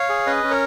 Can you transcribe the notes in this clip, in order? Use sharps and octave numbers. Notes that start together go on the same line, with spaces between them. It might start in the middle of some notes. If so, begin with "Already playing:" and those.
Already playing: C#5 F5
G#4
C#4 B4 D#5
C#4
A#4 C#5